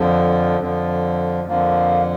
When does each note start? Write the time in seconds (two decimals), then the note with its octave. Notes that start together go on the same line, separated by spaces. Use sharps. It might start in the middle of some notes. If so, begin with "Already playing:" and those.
Already playing: F2 D3 F3
0.60 F2 D3 F3
1.48 F2 D3 F3 A#3